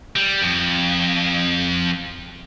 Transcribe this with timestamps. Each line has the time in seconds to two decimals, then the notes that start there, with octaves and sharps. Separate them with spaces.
0.16 G3
0.41 F2